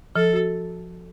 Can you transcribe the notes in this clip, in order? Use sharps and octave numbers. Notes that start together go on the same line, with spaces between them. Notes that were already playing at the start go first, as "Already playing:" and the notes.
F3 A4
F#4